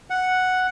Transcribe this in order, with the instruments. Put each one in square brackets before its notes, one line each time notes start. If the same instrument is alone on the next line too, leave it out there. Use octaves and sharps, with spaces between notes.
[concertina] F#5